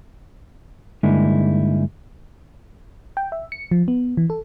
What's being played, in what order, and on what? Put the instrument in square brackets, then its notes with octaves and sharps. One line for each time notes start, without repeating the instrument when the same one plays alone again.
[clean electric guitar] G2 D3 G#3 A#3 D#4 E4
[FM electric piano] G5
E5
C#7
F3
B3
E3
A4